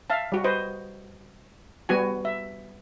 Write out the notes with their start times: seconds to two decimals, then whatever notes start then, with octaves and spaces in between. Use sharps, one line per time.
0.10 E5 F5 A5
0.32 G3 F#4
0.44 B4 C5 D#5
1.89 G3 B3 F#4 G#5
2.25 E5